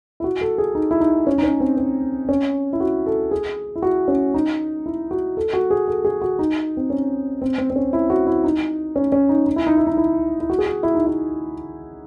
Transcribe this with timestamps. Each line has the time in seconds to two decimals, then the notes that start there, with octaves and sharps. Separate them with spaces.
0.20 E4
0.24 F#4
0.41 A4
0.58 G#4
0.75 D#4
0.91 E4
1.01 D#4
1.27 C#4
1.38 D#4
1.43 C#4
1.60 C4
1.77 C4
2.29 C#4
2.73 E4
2.80 F#4
3.06 A4
3.31 G#4
3.76 E4
3.82 F#4
4.08 C#4
4.34 D#4
4.86 E4
5.11 F#4
5.37 A4
5.53 F#4
5.70 G#4
5.88 A4
6.05 G#4
6.22 F#4
6.39 D#4
6.77 C4
6.90 C#4
7.42 C4
7.58 C4
7.70 C4
7.76 C#4
7.93 E4
8.10 F#4
8.27 E4
8.44 D#4
8.96 C#4
9.12 C#4
9.29 D#4
9.46 D#4
9.56 E4
9.67 D#4
9.77 E4
9.87 D#4
9.97 E4
10.40 E4
10.50 F#4
10.58 G#4
10.66 F#4
10.83 E4
10.95 D#4
11.07 E4